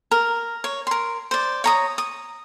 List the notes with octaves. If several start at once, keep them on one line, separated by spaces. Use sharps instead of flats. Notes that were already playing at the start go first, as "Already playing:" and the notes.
A#4
C#5
A#4 C6
C5 D5
C#5 A#5 D#6
D#6